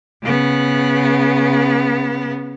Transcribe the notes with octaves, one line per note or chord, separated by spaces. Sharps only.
C#3 B3